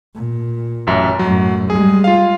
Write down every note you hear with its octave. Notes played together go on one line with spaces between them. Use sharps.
A#2
A1 F#2 E5
F#2 A2 F#3
G3 G#3 G#4
F4 F5